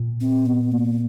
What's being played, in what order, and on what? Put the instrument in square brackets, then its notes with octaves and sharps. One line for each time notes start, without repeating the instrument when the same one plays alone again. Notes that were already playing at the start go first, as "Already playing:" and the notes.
Already playing: [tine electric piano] A#2
[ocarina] C4
B3
A#3